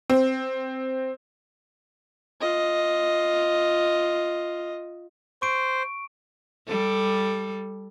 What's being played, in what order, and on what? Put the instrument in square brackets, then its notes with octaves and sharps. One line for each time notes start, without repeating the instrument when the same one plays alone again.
[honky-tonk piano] C4
[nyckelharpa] F4 D#5
[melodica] C5 [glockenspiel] C#6 D7
[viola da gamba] G3 A4